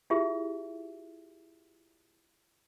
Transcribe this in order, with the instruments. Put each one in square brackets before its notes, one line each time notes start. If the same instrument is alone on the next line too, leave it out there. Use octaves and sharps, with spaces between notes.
[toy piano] E4 F4 G4 G#4 E5